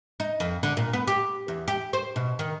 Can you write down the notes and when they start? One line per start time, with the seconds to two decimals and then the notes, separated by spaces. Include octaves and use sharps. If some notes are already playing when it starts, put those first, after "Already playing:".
0.20 D#4
0.40 F2
0.63 D3
0.77 A#2
0.93 B3
1.08 G4
1.48 E2
1.68 G4
1.93 C5
2.16 B2
2.39 D#3